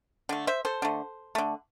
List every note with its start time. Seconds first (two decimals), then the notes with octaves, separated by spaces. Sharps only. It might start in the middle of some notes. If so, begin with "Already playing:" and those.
0.29 D3 A3
0.47 C5 E5
0.65 A4 C5
0.82 D3 A3
1.35 D3 A3